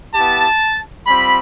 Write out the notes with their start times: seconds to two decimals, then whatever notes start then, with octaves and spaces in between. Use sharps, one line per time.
0.14 B3 E4 G4 A5
1.06 G3 C4 F4 B5